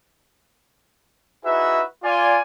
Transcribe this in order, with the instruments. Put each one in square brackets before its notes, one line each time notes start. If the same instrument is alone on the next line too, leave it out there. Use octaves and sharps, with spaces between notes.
[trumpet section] D#4 E4 F#4 G#4 B4 E5
F4 D5 G#5